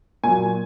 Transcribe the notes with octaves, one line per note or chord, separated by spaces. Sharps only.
A#2 F#3 G#5